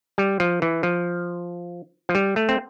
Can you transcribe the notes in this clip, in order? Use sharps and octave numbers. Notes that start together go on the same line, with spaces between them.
G3
F3
E3
F3
F3
G3
A3
C4